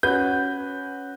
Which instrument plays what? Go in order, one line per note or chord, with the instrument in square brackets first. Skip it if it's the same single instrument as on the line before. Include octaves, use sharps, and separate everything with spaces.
[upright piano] C#4 F#4 B4 [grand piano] G6